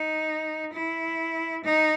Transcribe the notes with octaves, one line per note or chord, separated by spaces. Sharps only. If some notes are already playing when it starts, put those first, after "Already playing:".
Already playing: D#4
E4
D#4